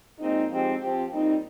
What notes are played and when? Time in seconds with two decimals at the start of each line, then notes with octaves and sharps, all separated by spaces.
0.19 A#2 G#3 C4 D#4
0.48 F3 G#3 C4 D#4 G4
0.78 F3 C4 G4
1.09 A#2 G3 C4 D#4